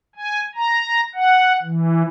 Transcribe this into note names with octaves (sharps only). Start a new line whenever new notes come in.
G#5
A#5
F#5
E3